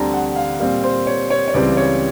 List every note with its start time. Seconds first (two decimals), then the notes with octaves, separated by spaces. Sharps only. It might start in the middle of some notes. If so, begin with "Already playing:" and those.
Already playing: D2 D3 G3 C4 A5 A#5
0.14 F#5
0.36 F5
0.59 A#2 G3 C4 F5
0.84 C5
1.07 C#5
1.30 C#5
1.48 C#5
1.54 C#2 C#3 E3 G3 C4 D5
1.77 C#5